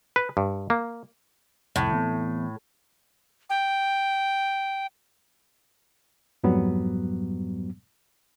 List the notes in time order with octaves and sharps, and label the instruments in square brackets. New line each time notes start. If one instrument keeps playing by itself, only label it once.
[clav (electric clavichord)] B4
G2
A#3
[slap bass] C2 F2 [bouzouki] A2
[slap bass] E3 B3 C4
[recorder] G5
[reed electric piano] F2 G#2 F#3 G3 B3